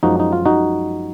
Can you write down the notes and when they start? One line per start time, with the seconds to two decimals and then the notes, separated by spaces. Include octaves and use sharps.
0.03 F#2 F3 G#3 D#4 F#4
0.20 D#4
0.32 F4
0.45 D#4 F#4